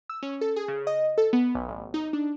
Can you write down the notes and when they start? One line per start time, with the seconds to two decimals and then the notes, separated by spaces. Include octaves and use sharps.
0.09 E6
0.22 C#4
0.41 A4
0.56 G#4
0.68 C#3
0.87 D#5
1.18 A4
1.33 B3
1.55 B1
1.68 A1
1.94 D#4
2.13 D4